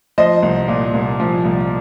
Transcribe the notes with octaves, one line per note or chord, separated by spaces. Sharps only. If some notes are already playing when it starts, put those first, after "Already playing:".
F3 C5 D#5
C2
A#2
C2
F3
C2